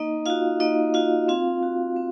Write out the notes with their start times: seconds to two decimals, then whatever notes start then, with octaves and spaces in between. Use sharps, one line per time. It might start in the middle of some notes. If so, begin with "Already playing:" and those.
Already playing: A#3 D#4 D#5
0.26 D#4 F4 F#4 F5
0.60 A#3 D#4 D#5
0.94 D#4 F4 F#4 F5
1.28 C4 F4 F5
1.63 F#4
1.96 C4